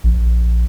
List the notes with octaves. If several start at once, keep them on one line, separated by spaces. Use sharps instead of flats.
A#1